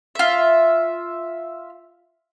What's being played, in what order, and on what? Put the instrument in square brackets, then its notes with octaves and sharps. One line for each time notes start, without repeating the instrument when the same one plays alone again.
[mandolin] F4 E5